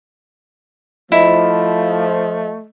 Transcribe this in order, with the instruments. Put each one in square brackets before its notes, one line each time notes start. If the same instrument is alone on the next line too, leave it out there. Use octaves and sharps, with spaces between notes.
[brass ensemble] F3 [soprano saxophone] A3 [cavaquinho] E4 [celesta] D#5